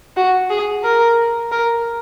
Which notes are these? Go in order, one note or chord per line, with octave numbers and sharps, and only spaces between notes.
F#4
G#4
A#4
A#4